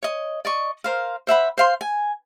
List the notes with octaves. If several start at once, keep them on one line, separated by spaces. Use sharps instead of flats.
C#5 D#5
D5 D#5 C#6
A#4 C5 F5
C5 E5 F#5 B5
C5 F5 C6
G#5